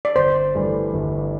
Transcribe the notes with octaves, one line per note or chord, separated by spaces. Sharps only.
D5
G1 C5
G2 E3 A3 D4
G1